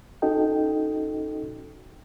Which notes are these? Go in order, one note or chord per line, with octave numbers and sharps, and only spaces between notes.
C#4 D#4 F#4 A4 D#5 G5